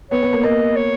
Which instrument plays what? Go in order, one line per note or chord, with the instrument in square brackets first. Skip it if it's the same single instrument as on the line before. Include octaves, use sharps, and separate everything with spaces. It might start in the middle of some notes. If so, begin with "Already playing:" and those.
[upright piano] B3 [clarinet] C#5
[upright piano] B3
A#3
[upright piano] A#3 [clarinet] D#5
[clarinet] C#5